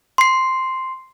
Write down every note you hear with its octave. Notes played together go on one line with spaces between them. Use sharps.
C6 C7